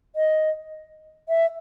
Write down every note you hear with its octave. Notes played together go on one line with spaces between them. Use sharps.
D#5
E5